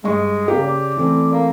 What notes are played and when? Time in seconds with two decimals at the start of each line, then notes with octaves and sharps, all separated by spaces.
0.04 G2 G#3 D#5 C#6
0.48 C#3 A#3 G4
0.64 D5
0.97 E3 A3 C4
1.32 A#3